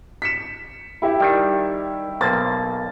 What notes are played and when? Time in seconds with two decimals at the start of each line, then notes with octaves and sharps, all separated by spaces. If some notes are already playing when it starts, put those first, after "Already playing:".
0.22 B6 C#7 E7
1.02 E4 G4 E5
1.20 D#3 G3
2.21 B1 A#3 C5 A6